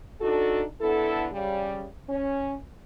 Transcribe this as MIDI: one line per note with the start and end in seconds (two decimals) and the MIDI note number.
0.20 0.63 62
0.20 0.63 63
0.20 0.63 66
0.20 0.63 69
0.81 1.27 50
0.81 1.27 59
0.81 1.27 64
0.81 1.27 69
1.32 1.84 49
1.32 1.84 55
2.10 2.56 61